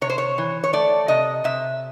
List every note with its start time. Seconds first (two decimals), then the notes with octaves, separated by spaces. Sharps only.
0.01 C3 C#5
0.09 C5
0.18 C#5
0.38 E3
0.64 C#5
0.73 A3 D5
1.08 C3 D#5
1.44 C3 E5